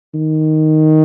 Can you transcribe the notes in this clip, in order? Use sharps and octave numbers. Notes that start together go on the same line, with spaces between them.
D#3